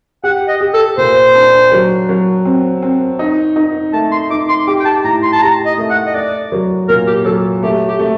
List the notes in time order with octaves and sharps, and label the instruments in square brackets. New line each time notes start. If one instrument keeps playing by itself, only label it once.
[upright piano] G4 [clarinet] F#5
[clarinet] D#5
[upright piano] G4
[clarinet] A4
[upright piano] A#2 [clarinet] C5
[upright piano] D4
F#3
F#3
C4
C4
D#4
D#4
[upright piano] A3 [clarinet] A5
[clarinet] C6
[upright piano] D#4 [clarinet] D6
[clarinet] C6
[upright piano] G4 [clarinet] D6
[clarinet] G5
A5
[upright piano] A2 [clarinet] A#5
[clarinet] C6
A5
[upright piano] G4 [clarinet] A#5
[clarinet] D#5
[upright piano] A3
[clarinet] F#5
D#5
[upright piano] A3 [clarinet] D5
[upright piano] F#3
[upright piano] A#2 [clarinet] A#4
[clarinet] G4
[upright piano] F#3 [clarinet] A4
[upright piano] A3 [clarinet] G4
[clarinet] G4
[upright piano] A3